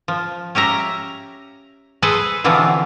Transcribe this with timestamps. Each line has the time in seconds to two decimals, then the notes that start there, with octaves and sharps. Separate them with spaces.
0.08 F3
0.55 C#4 G4 E5 A#5
2.02 G#4 A4 B4 C5
2.44 B2 D3 E3 F3 B3 C4